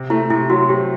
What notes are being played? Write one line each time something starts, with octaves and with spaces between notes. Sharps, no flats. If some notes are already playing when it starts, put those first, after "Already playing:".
Already playing: C3 C4
A3 E4
C3 E4
F#3 F#4
C3 G4